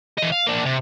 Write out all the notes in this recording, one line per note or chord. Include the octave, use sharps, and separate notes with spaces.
E3 D#5
F5
A#3 D4
C3